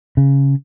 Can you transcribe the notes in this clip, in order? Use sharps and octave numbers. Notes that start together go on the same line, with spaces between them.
C#3